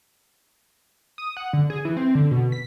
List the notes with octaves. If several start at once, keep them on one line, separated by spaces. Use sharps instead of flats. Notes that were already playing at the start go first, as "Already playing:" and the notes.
D#6
F#5
D3
G#4
E3
C4
D3
B2
B6